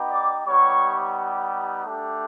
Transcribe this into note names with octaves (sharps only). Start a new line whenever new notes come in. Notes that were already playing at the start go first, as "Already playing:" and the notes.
Already playing: B3 D#4 G4
D5 D6
G3 B3 D#4 G4 C#5 C#6
A3 D4 G4